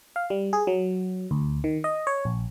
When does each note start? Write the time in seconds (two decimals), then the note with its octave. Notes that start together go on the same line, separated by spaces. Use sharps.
0.16 F5
0.30 G3
0.53 G#4
0.67 F#3
1.31 D2
1.64 D#3
1.84 D#5
2.07 C#5
2.25 A#1